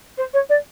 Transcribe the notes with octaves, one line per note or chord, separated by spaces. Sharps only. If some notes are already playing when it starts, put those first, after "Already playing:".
C5
C#5
D5